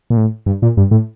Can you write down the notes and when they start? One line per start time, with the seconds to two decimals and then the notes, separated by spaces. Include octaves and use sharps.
0.10 A#2
0.17 A2
0.46 G2
0.62 A#2
0.77 G2
0.91 A2